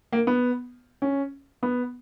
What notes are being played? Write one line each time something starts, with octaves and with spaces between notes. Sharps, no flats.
A#3
B3
C#4
B3